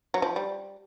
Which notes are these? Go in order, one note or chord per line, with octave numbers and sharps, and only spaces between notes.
F#3
F3
G3